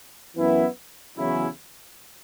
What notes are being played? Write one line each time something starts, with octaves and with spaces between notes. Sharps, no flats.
F#2 E3 B3 E4
E2 C#3 F#3 C#4 E4